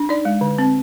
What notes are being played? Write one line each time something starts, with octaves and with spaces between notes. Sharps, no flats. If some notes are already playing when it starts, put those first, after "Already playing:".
Already playing: D4
D#4 D5
G#3
D3
C4